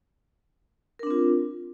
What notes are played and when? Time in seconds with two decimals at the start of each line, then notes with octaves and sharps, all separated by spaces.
0.99 A#4
1.03 D4
1.07 C4
1.11 F4